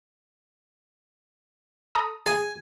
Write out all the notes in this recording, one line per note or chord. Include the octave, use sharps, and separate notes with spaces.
A4 A#5 D#6
G#4 G#5